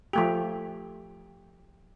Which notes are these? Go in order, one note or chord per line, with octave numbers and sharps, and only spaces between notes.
F3 A3 G4